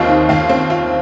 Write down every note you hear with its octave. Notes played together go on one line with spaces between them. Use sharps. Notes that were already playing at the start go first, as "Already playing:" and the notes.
Already playing: D#2 C4 F4 D#5 F5
D#3
D#2 F5
C4
F4